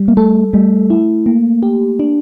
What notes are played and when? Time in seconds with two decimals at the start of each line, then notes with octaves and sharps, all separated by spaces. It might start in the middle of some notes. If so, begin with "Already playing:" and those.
Already playing: G3
0.08 A#3
0.17 A3 A4
0.53 G3 A3
0.90 E4
1.26 A#3
1.63 G4
1.99 D4